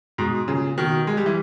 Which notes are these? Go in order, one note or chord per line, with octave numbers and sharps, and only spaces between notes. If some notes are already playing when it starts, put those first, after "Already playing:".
G#2 B2
A#2 C#3
B2 D#3
G#3
G3
E3